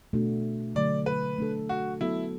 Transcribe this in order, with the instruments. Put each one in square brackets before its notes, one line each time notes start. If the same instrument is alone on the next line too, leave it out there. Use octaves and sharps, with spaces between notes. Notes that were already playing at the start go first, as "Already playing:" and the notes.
[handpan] B2 A3 D4 F#4
[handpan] D3 F#3 A3 [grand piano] D5
[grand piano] B4
[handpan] A3 D4 A4
[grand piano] F#4
[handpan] F#3 B3 F#4 A4 [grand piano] E4